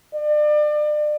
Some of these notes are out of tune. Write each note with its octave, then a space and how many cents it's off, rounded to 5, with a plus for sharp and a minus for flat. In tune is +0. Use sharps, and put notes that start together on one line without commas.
D5 +35